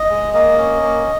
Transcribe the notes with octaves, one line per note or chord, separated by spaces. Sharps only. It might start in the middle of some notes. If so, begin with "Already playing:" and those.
Already playing: D#5
G#3
A#3 D#5
C#4
A#3